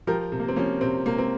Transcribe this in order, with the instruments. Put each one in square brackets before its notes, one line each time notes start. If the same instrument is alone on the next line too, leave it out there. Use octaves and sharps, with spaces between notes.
[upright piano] F3 G4 A#4
C3
A#3
C4
F3 A#3 C#4
C3 C4
C3 A#3
C4